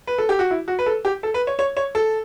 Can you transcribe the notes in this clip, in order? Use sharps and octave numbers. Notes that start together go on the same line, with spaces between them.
B4
A4
G4
F#4
E4
F#4
B4
A4
G4
A4
B4
C#5
C#5
C#5
A4